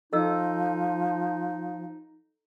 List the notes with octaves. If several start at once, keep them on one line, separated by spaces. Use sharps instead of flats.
F3 D#4 A4 D#5 E6